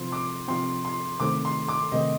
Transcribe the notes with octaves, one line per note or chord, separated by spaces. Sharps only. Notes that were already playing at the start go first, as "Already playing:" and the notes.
Already playing: C3 F3 C4 C6
D6
C3 F3 C4 C6
C6
C3 D#3 A3 C4 D6
C6
D6
C3 D#3 A3 C4 D#5